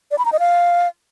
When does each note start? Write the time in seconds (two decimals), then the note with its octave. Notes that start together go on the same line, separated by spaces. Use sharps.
0.11 D5
0.18 B5
0.25 A#5
0.32 D#5
0.39 F5